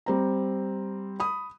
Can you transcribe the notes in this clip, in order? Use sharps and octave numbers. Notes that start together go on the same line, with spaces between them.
G3 C4 A#5
B5 D#6